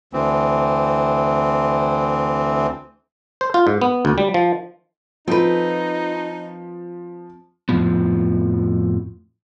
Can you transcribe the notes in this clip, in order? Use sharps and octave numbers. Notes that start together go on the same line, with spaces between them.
D2 E3 C4
C5
F4
G#2
B3
D2
G3
F3
F3 C4 D#4 B4
F2 A2 C3 F3 B3